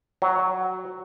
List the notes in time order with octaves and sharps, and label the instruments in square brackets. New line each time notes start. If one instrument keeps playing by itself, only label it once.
[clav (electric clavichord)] F#3